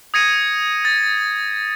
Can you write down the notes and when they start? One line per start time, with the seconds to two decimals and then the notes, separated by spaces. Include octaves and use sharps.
0.14 D#6 G#6 A#6 C#7 D#7
0.85 A6